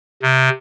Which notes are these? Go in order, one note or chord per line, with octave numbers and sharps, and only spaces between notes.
C3